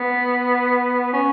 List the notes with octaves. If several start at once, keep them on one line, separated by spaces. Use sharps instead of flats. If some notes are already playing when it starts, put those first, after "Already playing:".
Already playing: B3
C#4